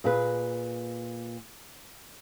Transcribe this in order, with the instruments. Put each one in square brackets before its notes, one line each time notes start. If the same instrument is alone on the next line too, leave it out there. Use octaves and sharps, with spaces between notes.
[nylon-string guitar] A#2 G#4 B4